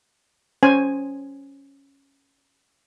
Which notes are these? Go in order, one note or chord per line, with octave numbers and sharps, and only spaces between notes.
C#4 C5 G#5